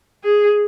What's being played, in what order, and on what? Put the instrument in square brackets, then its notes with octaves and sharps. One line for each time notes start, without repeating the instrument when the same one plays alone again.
[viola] G#4